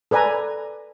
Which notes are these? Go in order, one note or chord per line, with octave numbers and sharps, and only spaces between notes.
A4 B4 D5 G#5 A#5